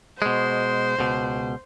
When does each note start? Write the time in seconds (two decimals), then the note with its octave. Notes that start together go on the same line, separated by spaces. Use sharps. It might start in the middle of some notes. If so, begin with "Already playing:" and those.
0.22 B2 G#3 C5
0.99 C#2 B2